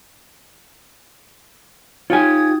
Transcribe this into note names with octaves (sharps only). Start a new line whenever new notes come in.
D#4 F4 G4 C#5 G5 G#5 D#6 G#6